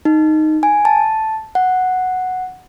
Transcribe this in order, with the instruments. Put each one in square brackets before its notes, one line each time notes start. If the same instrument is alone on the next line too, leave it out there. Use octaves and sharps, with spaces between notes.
[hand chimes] D#4
G#5
A5
F#5